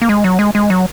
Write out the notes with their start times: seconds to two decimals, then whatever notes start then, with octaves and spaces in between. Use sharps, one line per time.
0.02 A#3
0.09 G#3
0.24 F#3
0.39 G#3
0.55 G#3
0.70 F#3